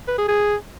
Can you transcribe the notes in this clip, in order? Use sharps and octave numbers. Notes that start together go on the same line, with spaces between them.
B4
G#4
G#4